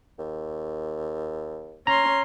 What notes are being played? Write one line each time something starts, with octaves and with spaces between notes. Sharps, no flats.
D#2
C#4 A#5 C6